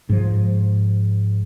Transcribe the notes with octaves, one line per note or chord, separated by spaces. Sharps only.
G#2 F3